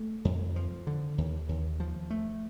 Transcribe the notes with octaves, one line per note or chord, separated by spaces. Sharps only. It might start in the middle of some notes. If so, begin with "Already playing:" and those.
Already playing: A3
F2
F3
D3
D#2
D#2
F3
A3